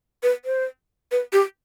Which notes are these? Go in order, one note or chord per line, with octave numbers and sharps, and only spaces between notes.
B4
C5
B4
G4